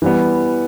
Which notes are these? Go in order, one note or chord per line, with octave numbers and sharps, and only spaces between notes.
E3 G3 B3